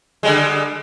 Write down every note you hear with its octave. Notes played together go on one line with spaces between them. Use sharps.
D3 G3 G#3